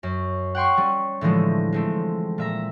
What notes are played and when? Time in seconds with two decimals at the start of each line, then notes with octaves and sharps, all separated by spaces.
0.03 F#2
0.55 F#5 G5 C6 C#6
0.77 G3 C#4
1.21 A2 D3 E3 F3 G#3 A3
1.73 G#3 A3 C4
2.38 A#2 E5 A#5